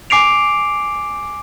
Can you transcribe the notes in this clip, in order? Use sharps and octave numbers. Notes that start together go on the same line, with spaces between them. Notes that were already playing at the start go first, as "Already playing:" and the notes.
G#5 D6 C7 D7 F7